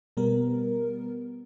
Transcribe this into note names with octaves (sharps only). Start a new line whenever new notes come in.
B2 G3 B3 A#4